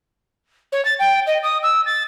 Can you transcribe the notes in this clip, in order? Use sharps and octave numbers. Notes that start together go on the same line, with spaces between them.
C#5
A6
G5
D#5
D#6
E6
A6